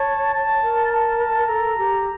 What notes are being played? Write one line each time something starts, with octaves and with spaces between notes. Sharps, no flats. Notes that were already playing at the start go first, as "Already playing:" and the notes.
Already playing: C#5 A5
A5
A#4
A5
A4 A#5
G4